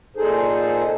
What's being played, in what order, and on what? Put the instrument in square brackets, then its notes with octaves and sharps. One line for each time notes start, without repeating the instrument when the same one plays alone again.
[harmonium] A#2 D#4 G#4 A4 C5